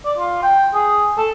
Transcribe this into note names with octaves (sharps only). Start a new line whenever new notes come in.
D5
F4
G5
G#4
A4